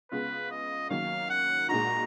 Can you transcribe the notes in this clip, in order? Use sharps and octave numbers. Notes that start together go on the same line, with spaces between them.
C#3 G#3 B3 F4 B4
D#5
D#3 F#3 A#3 C#4 F5
F#5
A#2 G#3 D#4 F#4 A#5